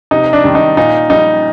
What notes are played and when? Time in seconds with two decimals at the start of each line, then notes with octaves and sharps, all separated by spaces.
0.11 C3 D#4
0.33 D4
0.44 D#3 G3
0.55 D#4
0.77 A#2 D#4
1.10 G3 D#4